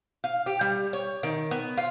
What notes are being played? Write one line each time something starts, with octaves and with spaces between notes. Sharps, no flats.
F5
G4
G3
C#5
D#3
B3
F4